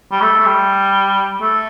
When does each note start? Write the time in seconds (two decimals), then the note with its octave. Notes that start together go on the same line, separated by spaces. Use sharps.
0.12 G3
0.22 A3
0.40 A3
0.46 G3
1.41 A3